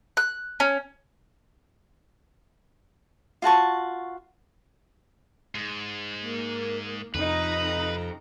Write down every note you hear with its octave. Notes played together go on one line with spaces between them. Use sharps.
F#6
C#4
F4 F#4 A5 C#6
G#2
A#3
F2 C3 F3 D#4 B4 A#5